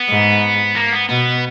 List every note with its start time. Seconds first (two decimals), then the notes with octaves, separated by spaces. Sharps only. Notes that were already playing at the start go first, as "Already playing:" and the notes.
Already playing: B3
0.09 G#2
0.76 A#3
0.92 B3
1.09 B2 B3